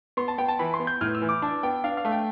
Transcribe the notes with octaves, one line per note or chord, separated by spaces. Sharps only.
B3 C6
A5
B3 G5
A5
E3 B5
C6
B3
G6
A2 F6
E6
E3
D6
D4 A5
B3 G5
D4 F5
F5
A3
G5